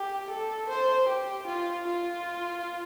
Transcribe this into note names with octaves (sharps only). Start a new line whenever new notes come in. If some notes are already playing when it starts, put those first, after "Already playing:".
Already playing: G4
A4
C5
G4
F4
F4